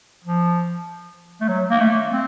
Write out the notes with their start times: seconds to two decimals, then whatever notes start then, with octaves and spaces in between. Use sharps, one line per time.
0.24 F3
1.41 A3
1.49 F#3
1.71 A#3
1.80 A3
2.11 C4